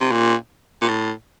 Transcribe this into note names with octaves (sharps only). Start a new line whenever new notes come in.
C3
A#2
A#2
A2